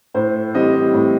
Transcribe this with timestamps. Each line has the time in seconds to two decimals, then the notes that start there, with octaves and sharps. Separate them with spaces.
0.14 A2 C5
0.54 E3 G3 C4 D#5
0.93 A2